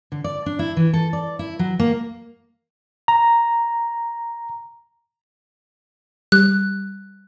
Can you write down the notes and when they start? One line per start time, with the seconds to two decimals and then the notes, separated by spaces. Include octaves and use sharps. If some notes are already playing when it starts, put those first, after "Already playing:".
0.12 D3
0.24 D5
0.46 D4
0.59 E4
0.77 E3
0.93 A4
1.13 D5
1.39 E4
1.59 F#3
1.79 A#3
3.08 A#5
6.32 G3 F#6